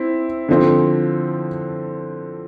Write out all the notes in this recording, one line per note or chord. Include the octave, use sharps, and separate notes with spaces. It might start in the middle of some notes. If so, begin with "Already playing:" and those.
Already playing: C4 E4
D3 F3 C4